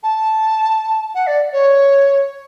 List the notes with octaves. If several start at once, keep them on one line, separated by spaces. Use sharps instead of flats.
A5
F#5
D5
C#5